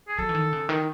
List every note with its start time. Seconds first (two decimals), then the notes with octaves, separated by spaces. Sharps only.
0.08 G#4
0.18 F#3 A4
0.29 E3
0.35 D#3
0.53 C#3
0.69 D#3